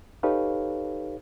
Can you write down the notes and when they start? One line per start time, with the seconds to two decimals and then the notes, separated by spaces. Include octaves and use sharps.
0.23 D#4 G4 A4 B4 C#5 F5